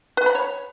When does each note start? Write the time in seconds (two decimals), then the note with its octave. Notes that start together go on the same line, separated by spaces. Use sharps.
0.17 B4
0.26 B5
0.35 C#5